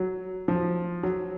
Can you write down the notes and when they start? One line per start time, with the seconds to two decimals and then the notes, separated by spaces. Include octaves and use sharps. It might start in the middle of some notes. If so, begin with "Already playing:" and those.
Already playing: F#3
0.48 F3
1.03 F#3